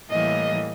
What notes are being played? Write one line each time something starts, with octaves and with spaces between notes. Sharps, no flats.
A2 E3 G3 A#3 D#5